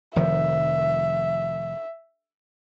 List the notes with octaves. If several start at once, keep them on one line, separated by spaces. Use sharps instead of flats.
F1 D#3 F3 E5